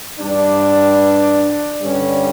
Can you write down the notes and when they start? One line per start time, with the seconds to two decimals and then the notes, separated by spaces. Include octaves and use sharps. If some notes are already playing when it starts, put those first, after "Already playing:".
0.18 G2 E3 G3 D4
1.80 G2 D3 G3 C#4